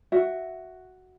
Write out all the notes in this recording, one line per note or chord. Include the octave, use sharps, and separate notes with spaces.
F#4 E5